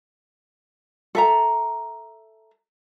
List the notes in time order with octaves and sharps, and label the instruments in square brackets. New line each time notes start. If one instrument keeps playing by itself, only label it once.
[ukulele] A4 E5 A#5